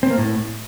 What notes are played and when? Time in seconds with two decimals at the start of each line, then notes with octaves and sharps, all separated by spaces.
0.03 C4
0.10 A#3
0.18 A2